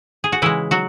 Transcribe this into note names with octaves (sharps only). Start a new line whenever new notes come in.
G#4
F#4
C#3 E3 G#3 E4
F#3 F#4